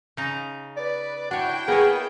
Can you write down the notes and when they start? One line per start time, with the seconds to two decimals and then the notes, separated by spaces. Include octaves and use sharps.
0.17 C#3 D#4
0.77 B4 D5
1.31 D4 E4 F#4 C#5 G5
1.68 A#3 B3 G#4 C#5